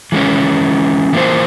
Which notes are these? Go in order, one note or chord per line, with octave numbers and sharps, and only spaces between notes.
E3 G#3 C#4
E3 A#3 F4 C5